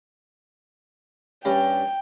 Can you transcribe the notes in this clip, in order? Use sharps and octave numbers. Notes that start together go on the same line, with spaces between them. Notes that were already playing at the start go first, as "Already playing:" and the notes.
G2 C#4 G5 B5